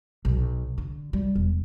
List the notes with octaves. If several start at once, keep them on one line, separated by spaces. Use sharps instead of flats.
B1
D3
G3
E1